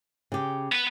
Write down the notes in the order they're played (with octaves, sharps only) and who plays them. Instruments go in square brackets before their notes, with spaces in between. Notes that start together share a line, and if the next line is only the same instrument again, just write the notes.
[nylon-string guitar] C#3 G4
[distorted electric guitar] B3 B4